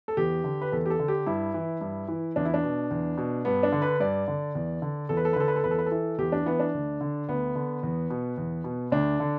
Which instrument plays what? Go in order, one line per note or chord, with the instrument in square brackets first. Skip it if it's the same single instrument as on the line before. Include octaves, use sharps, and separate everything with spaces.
[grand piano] A4
E2 G4
D3
B4
E2 A4
G4
A4
D3
G4
G2 E4
E3
G2
E3
E2 D4
E4
D4
B2
E2
B2
G2 B3
D4
D3
B4
G2 D5
D3
E2
D3
E2 A4
B4
A4
B4
D3 A4
B4
A4
E2 B4
A4
B4
A4
E3
E2 G4
D4
E3 B3
D4
D2
D3
D2 B3
D3
E2
B2
E2
B2
D2 D4
D3